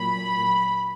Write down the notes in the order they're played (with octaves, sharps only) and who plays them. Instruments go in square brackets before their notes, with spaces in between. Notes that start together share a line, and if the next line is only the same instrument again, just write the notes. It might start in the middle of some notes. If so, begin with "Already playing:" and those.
Already playing: [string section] A#2 F#3 B5